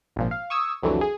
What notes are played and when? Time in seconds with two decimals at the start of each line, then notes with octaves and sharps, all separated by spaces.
0.16 G#1 A#2 F3
0.31 F5
0.50 C#6 D#6 E6 G#6
0.83 C2 F2 D3 E3 F#3 A3
1.01 G#4